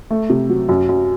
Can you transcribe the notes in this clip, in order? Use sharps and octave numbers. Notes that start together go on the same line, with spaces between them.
A3
C3
F#3
F#2
F#2